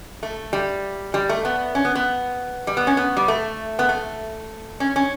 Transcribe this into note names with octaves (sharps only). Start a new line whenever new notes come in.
A3
G3
G3
A3
B3
C#4
B3
B3
G3
B3
C#4
B3
G3
A3
B3
A3
C#4
C#4